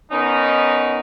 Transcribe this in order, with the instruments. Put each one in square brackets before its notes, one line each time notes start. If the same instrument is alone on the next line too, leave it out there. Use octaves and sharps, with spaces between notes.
[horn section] D#3 B3 C#4 D#4